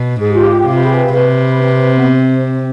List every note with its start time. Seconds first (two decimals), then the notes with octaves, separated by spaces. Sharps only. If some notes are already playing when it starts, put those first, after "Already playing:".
Already playing: B2
0.21 G#2 G#4
0.28 G4
0.35 F4
0.42 G4
0.67 C3
0.76 B4
0.84 G#4
0.92 B4
1.14 C3
1.61 C4
1.97 B3
2.07 C4